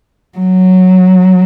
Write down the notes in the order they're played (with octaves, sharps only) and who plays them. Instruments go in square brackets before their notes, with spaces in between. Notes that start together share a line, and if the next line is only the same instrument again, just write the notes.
[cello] F#3